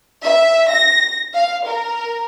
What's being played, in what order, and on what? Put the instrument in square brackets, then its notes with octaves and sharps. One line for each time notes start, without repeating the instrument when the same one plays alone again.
[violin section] E5
A#6
F5
A#4